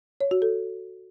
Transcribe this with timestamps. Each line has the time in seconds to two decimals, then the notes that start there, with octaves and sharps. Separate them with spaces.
0.21 C#5
0.31 F#4
0.42 A4